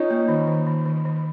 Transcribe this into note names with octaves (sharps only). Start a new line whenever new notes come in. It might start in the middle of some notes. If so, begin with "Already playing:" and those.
Already playing: C#4 D#4 F4
A#3
D#3
D#3
D#3
D#3
D#3